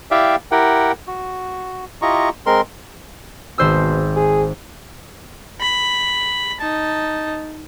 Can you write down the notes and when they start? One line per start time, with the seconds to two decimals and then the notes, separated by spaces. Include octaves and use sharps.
0.11 E4 G4 D5 E5 F5 G5
0.51 E4 G4 A#4 F#5 G5
1.07 F#4
2.02 E4 F4 G4 D#5 A#5 C#6
2.46 G#3 C4 A#4 C6
3.58 G#1 B2 C5 E6
4.16 G#4
5.61 B5
6.61 D#4 A5